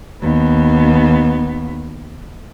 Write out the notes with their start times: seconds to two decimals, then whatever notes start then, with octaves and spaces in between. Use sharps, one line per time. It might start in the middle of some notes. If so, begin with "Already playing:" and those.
0.22 D#2 B3